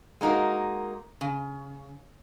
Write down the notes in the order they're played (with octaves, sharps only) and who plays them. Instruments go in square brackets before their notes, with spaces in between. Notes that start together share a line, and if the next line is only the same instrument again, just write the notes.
[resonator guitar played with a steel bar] G#3 A#3 D#4 F#4 A#4
C#3